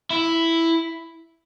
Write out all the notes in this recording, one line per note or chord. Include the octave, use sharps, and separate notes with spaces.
E4